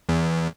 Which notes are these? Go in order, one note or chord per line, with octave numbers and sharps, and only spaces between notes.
E2